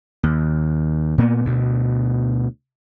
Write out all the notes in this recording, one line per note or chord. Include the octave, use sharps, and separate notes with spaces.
D#2
A#2 A#3 B3
D2 B2